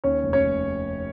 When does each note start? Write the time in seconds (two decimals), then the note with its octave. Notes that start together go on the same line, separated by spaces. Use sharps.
0.04 D#2 C#4 C#5
0.24 F1
0.33 C#4 C#5
0.44 F1